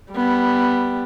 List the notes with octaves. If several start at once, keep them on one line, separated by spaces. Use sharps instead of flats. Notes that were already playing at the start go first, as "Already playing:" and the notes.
G3 B3